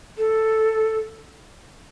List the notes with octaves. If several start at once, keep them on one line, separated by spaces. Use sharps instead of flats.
A4